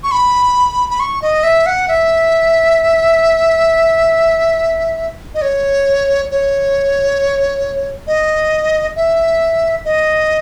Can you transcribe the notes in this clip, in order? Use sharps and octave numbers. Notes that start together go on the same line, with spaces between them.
C#6
B5
B5
C#6
D#5
E5
F#5
E5
D#5
C#5
C#5
D#5
E5
D#5